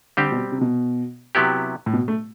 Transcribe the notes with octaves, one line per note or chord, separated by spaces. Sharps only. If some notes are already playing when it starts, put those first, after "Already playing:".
D3 G3 C4 G4
B2
C3
B2
C3 F#3 B3 E4 G4
A2
B2
A3